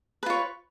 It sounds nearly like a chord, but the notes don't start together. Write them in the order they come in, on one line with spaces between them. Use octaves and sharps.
B4 F4 C#5